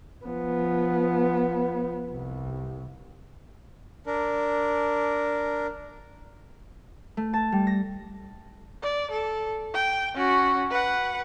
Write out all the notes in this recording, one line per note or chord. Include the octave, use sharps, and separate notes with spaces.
F3 B3
C2
D4 A#4
A3
A5
G3
A#6
D5
A4
G5
C#4 F#4
B4 F#5